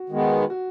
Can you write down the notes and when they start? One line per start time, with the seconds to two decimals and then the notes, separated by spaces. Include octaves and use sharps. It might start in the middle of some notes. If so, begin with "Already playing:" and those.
Already playing: F#4
0.10 D#3 G#3 B3
0.50 F#4